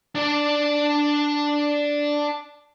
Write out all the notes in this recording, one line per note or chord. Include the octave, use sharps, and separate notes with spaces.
D4 D5